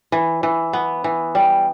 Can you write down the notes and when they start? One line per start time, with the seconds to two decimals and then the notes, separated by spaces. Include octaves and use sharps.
0.12 E3
0.43 E3
0.73 B3
1.04 E3
1.35 G3